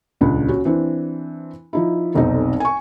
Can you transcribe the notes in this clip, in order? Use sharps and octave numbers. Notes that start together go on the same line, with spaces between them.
D#1 C#2 D4
C#4 F#4
E3 C4 D4
F3 D#4 E4
F1 B1 C4 D#4
G#5 C#6